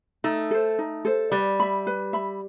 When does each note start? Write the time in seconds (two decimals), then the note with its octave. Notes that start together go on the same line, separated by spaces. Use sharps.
0.24 A3 D#4
0.51 A4 C5
0.79 D#4
1.05 A4 C5
1.32 G3 B4
1.60 E5 B5
1.87 B4
2.13 E5 B5